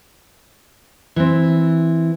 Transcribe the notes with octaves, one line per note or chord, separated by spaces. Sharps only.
E3 C4